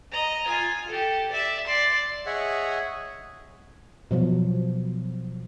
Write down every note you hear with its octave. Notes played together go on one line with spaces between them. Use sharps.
D#5 A#5
F4 G#5
G4 A4
D5 E5
D5 C6
G#4 C#5 D#5 E5 F#5
B2 F3 F#3